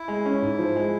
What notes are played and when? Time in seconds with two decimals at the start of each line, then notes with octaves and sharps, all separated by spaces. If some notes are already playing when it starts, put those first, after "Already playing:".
Already playing: E4
0.08 G#3
0.25 C#4
0.42 G#2
0.59 F3
0.76 G#3